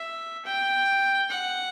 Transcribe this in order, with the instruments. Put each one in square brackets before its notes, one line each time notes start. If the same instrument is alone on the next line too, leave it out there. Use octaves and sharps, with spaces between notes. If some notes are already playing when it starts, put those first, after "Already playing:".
Already playing: [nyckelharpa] E5
G5
F#5